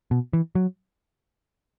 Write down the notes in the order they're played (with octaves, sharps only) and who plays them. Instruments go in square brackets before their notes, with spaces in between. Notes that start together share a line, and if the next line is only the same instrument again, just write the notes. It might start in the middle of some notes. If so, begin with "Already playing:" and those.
[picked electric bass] B2
E3
F#3